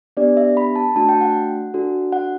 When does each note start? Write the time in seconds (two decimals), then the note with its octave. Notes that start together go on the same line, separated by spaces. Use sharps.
0.17 B3 D4 G4 D5
0.37 E5
0.57 B5
0.76 A5
0.95 A3 D4 F#4 A5
1.09 G5
1.21 F#5
1.74 D4 F#4 A4
2.12 F#5